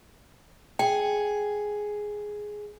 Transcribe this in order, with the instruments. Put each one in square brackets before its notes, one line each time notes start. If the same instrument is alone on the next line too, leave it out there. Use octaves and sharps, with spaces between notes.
[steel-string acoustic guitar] G#4 [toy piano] G5